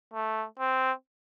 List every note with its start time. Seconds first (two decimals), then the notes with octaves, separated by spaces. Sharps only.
0.14 A3
0.59 C4